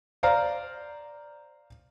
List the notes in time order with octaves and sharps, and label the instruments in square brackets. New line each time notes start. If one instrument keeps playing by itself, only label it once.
[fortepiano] C5 D5 F5 A#5